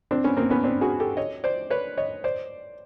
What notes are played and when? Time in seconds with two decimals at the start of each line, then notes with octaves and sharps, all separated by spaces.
0.11 C4 D4
0.24 B3 C#4
0.37 A#3 C4
0.50 B3 C#4
0.64 C4 D4
0.81 F#4 G#4
1.00 G4 A4
1.17 C#5 D#5
1.44 C5 D5
1.70 B4 C#5
1.97 C#5 D#5
2.24 C5 D5